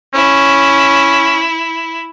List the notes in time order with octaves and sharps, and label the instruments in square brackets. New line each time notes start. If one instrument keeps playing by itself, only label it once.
[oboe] C#4 [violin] E4